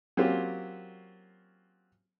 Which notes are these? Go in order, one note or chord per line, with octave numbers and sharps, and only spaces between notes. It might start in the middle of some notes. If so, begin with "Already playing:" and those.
F#3 A#3 C4 C#4 F4 G4